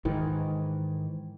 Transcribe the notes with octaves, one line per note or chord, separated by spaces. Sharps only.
G#2 D#3 E3